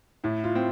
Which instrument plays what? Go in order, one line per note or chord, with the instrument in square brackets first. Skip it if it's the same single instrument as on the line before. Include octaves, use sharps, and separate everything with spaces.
[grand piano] A2 [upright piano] E4
[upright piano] F4
[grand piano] C4